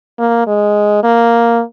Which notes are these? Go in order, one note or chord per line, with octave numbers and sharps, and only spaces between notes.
A#3
G#3
A#3